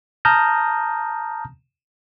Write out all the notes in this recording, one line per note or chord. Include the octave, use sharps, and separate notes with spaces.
A5 A#5 D#6 F6 G6 A#6